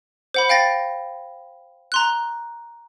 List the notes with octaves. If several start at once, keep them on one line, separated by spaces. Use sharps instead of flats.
C5 F#5 B5
F5 G5 A6 A#6
A#5 C6 F#6